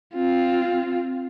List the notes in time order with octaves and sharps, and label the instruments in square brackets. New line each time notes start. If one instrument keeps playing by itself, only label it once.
[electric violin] C4 F4